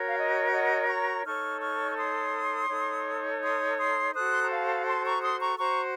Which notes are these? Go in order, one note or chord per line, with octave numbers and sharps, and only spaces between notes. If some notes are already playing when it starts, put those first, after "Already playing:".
Already playing: F#4 A#4 C#5
F5
D#5
D#5 F#5
D#6
A#5 C#6
D#4 A4 C#5 C#6 F6
C#6 F6
C#6
C6 D#6
D#4 A4 C#5
C6 D#6
C6 D#6
F#4 A4 C5 D#6 F#6
C6
A#5
F5 A5
A5 C6
A#5 C#6
C6 D#6
A#5 C#6
F#4 C5 A#5 C#6